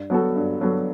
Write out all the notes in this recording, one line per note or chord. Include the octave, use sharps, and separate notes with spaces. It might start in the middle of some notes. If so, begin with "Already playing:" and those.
Already playing: G2
F#3 B3 F#4 A4
G2
F#3 B3 F#4 A4